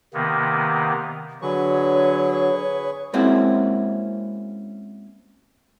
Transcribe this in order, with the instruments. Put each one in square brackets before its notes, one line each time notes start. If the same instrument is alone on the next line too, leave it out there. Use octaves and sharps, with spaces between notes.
[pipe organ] C3 D#3 A#3 B3
[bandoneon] D3 F#3 [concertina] G#4 B4 C#6 [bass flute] C#5
[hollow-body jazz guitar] G#3 A#3 C4 C#4 E4 F#4